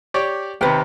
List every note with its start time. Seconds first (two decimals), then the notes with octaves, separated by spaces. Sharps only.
0.14 G4 C#5 D5
0.61 D#2 C3 B4 G5